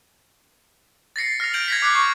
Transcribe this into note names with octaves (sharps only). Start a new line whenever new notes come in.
A6 A#6 C7 C#7
F6 A#6 C7 F7
G6 D7 F7 F#7
G#6 A#6 B6
D6 F#6 C7
C#6